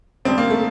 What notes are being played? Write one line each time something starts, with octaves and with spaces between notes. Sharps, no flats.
F2 D3 G3 C4
A#3
A3